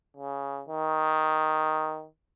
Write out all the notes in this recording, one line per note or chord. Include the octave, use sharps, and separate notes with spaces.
C#3
D#3